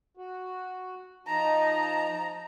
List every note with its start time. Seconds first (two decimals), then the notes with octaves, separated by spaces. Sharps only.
0.17 F#4
1.27 F3 D#4 A5 A#5